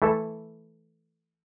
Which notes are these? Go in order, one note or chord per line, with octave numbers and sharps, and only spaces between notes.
E3 A3 E4 A4